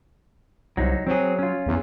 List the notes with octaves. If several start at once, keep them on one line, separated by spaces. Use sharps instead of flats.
C2 F#3 D#4
F#3 C4 G#4
C#4 F4
E2